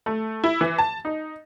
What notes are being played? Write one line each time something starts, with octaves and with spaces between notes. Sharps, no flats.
A3
E4
E3
A5
D#4